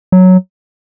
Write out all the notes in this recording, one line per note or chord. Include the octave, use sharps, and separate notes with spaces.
F#3